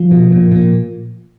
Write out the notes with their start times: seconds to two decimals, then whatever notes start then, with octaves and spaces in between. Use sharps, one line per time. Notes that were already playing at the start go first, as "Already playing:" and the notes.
Already playing: F3
0.11 B2
0.32 A#2
0.52 A#2